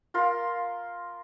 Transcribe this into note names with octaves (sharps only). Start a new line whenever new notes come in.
F4 A#4 C6